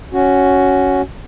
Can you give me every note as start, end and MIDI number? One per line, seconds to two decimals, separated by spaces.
0.13 1.02 61
0.13 1.02 66